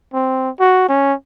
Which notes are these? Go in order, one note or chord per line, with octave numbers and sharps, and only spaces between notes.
C4
F#4
C#4